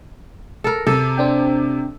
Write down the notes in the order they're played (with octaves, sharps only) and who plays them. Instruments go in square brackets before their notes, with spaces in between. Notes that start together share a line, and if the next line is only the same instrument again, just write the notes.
[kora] A4 A#4
[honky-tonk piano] C3 [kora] A4
[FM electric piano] C4 D4 G5